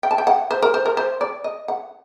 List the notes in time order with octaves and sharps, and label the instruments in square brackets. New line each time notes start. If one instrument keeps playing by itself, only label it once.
[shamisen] G5
A5
G5
F#5
C5
A#4
C5
A#4
C5
D5
D#5
F#5